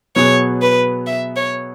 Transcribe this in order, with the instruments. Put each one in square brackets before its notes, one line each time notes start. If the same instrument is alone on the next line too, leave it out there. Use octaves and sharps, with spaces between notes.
[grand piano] B2 F#3 B3 G#4 [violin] C#5
[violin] B4
E5
C#5